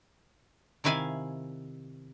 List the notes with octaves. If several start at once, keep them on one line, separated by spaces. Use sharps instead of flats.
C3 D#3 E4 F5 G#5